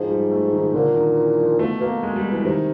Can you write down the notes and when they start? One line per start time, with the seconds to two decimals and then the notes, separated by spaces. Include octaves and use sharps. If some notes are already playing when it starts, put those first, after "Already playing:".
Already playing: G#2 F3
0.10 G3
0.31 A3
0.53 D#3
0.74 A#2 D3
0.95 D#3
1.16 E3
1.38 F3
1.59 B2 A3
1.81 B2 A#3
2.03 G#3
2.16 G3
2.32 E3
2.45 C3 D#3